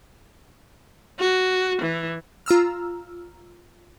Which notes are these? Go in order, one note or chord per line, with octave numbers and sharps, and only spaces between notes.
F#4
E3
F4 A#5 E6 F6